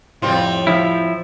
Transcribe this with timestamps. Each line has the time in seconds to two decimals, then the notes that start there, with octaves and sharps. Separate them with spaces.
0.22 F2 A2 G3 C4 F4
0.67 F3 E4